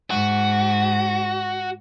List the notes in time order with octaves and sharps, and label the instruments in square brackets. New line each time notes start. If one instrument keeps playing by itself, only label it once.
[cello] G#2 [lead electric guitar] F#4